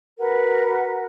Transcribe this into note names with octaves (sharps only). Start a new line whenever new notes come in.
F#4 A#4 B4 F#5